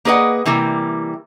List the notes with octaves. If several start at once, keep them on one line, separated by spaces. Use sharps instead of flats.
A#3 G#4 B4 D#5 F#5
C3 E3 G3 A#3